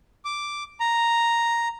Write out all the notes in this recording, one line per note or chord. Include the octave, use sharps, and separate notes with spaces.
D6
A#5